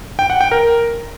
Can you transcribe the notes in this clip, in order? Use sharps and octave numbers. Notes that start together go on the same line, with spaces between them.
G5
F#5
G5
A#4